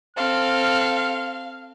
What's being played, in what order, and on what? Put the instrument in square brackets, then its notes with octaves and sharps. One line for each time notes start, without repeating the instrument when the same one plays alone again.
[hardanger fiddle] C4 A4 [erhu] F5 [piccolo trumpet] F6